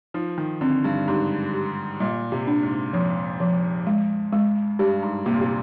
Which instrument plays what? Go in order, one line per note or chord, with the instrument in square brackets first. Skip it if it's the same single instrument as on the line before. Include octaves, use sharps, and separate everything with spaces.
[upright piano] F3 [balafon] D#4
[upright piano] D#3
[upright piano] D3 [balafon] C4
[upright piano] G2
[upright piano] G#2 [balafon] G4
[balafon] G4
[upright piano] A#2 [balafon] G3
[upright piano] C3
[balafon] D4
[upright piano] G#2
[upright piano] F2 [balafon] F3
[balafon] F3
G#3
G#3
[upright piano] G2 [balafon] G4
[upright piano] G#2
[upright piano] C3 [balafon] A#3
[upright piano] A#2
C3